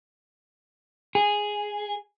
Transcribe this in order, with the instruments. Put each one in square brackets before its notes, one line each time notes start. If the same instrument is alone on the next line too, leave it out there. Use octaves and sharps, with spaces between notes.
[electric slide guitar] G#4